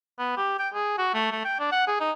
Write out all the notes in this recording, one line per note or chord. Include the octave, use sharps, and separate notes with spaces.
B3
G4
G5
G#4
F#4
A3
A3
G5
D4
F#5
G#4
D#4